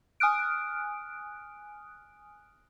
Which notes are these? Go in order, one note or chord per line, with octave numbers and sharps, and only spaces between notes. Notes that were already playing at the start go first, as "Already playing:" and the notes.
G#5 D#6 F6 F#6 D7